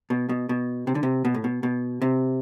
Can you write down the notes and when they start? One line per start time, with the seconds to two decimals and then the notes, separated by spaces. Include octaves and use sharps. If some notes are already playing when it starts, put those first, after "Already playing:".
0.10 B2
0.29 B2
0.49 B2
0.87 C3
0.95 D3
1.03 C3
1.25 B2
1.34 A2
1.44 B2
1.63 B2
2.02 C3